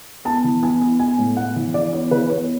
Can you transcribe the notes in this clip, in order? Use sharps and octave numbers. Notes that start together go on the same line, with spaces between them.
B3 A5
E3
B3 G#5
B3
B3 G#5
A2
B3 F#5
E3
E3 D5
B3 C#5
E3 B4
B3 C#5